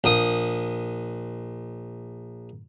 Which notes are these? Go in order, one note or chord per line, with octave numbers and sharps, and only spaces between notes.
A#1 D#6